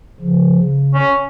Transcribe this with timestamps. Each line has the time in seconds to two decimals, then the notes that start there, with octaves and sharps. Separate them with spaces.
0.20 C#3 F3
0.57 C#3
0.94 C#4